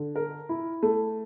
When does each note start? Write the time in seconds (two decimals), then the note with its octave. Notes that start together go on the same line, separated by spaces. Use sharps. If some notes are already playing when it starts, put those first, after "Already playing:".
Already playing: D3
0.16 A#4
0.49 E4
0.83 A3